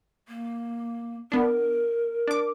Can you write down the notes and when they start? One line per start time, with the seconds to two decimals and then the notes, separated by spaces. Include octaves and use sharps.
0.28 A#3
1.32 B3 D4 A#4
2.28 D4 D6